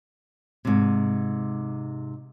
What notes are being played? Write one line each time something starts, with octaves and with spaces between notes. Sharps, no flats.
G#2 C3